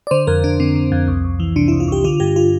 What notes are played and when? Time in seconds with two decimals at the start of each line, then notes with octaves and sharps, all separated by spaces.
0.07 D5
0.11 D3 C5
0.27 F2 A#4
0.44 F2 D4
0.60 D3 C4
0.76 D3
0.92 F2
1.08 C2
1.24 C2
1.40 E3
1.56 C3 D4
1.68 E4
1.72 C2
1.80 F4
1.88 C2 G4
2.04 D3 F4
2.20 G2 G4
2.36 F4